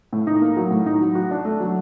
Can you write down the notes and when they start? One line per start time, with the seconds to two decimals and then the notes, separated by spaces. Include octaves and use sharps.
0.13 A2
0.27 D#4
0.42 A#3
0.57 F#3
0.71 A2
0.86 D#4
1.01 F#3
1.15 F#4
1.31 D4
1.45 A3
1.60 F#3